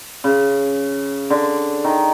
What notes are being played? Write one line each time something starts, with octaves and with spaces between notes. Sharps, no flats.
C#3
D3
D#3